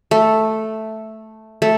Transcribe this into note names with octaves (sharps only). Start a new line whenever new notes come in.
A3
A3